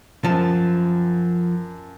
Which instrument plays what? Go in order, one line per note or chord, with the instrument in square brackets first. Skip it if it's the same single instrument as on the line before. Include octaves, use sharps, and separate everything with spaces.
[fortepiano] F#2 A5 [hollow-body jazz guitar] F3